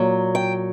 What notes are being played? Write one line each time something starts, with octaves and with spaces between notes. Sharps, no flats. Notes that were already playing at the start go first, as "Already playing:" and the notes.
Already playing: A#2 F#3
G5